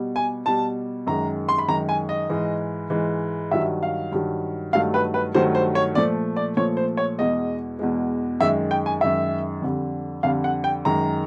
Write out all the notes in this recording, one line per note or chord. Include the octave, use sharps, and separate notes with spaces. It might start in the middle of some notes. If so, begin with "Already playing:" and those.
Already playing: B2 G3
G#5
B2 G3 A5
F#2 D#3 G#3 A#5
C6
B5
F#2 D#3 G#3 A#5
G#5
D#5
G#2 E3 G#3
G#2 E3 G#3
G2 D#3 F#3 E5
F5
G2 D#3 F#3
G2 D#3 F#3 A3 F5
B4
B4
G2 D#3 F#3 A3 C5
C5
C#5
A#2 F3 A3 D5
D5
A#2 F3 A3 C#5
C5
C#5
E2 B2 G#3 D#5
E2 B2 G#3
F#2 D#3 G#3 E5
G5
G#5
F#2 D#3 G#3 E5
F2 D3 G3
F2 D3 G3 F5
F#5
G5
F#2 D#3 G#3 A#5